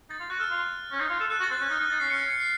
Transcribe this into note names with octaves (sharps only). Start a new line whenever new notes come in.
D#4 A6
F4
F#4 F#6
A4 F6
F4
C#4
D#4
F4
A4
A4 F#6
F#4
A6
C4
C#4 F#6
D#4 F6
D#4 F#6
D#4 A6
C#4 C7
C#4 C#7
C7
C#7
C7